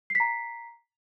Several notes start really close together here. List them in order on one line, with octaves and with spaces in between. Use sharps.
C7 B6 A#5